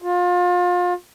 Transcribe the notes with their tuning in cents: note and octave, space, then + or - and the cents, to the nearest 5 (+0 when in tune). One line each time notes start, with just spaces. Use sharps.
F4 +30